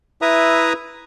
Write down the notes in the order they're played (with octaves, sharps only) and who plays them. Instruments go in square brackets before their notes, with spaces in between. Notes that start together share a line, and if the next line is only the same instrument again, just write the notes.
[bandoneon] E4 B4 E5 A#5 D#6